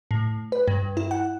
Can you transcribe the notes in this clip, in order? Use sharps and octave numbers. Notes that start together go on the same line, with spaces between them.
A2
B4
G2
E4
F#5